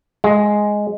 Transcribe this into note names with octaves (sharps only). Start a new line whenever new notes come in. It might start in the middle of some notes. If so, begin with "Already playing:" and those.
G#3